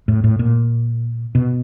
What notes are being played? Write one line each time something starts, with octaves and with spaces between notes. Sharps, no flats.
A2
A2
A#2
B2